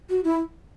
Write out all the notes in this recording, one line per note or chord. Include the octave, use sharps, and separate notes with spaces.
F#4
E4